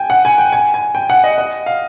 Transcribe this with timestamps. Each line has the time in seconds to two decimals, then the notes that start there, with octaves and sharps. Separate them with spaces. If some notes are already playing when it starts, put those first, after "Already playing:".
Already playing: G5 G#5
0.10 F#5
0.25 G#5
0.38 G5
0.53 G#5
0.74 G#5
0.95 G5
1.10 F#5
1.24 D#5
1.38 D#5
1.66 F5